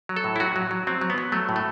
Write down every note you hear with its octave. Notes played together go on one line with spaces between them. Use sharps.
F#3
A4
A2
E4
F#3 F#4
F#3
F#3
F#3 C4
F#3
B3
F#3
F#3 A3
A2
A3